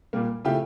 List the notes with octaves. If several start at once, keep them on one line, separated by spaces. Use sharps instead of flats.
A#2 G3 A#3
C#3 F3 A3 E4 G4